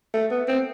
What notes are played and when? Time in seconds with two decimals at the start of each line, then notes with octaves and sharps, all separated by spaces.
0.14 A3
0.31 B3
0.48 C4